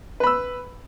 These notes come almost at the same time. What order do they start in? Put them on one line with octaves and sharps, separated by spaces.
B4 B5 E6